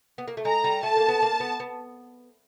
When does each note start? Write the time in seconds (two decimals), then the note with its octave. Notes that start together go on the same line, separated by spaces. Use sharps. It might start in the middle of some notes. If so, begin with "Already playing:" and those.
0.18 B3
0.28 A#3
0.37 A3
0.45 G#3 A#5
0.64 G3
0.83 A3 A5
0.97 A#3
1.08 B3
1.22 A#3
1.40 B3
1.60 B3